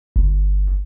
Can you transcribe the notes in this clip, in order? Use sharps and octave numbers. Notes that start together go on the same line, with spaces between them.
G1